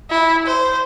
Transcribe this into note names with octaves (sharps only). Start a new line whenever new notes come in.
E4
C5